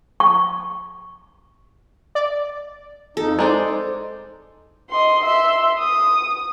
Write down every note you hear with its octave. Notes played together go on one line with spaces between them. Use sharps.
C#6
D5
F2 D#4 A4
G#3 D#4 C5 D5
D#5 C6
E5 C6
D#6